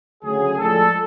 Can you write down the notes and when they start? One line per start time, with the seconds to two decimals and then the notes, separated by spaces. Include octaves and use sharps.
0.23 D2 C#3 F#3 G#4
0.58 A2 F3 G#3 D4 A4